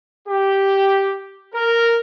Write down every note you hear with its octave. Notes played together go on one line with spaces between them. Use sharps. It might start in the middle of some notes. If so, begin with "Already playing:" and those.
G4
A#4